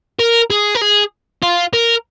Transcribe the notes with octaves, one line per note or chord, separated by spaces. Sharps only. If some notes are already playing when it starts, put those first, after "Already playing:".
A#4
G#4
A#4
G#4
F4
A#4